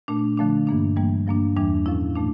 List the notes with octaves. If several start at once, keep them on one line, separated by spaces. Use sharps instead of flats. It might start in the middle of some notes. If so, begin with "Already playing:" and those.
A#2 A3 D4
D3 F3 A3 D4
G2 E3 A#3 D4
G2 E3 G3 A#3
G2 F3 A#3 D4
E2 E3 G3 D4
A2 F3 C#4 E4
A#2 F3 A3 D4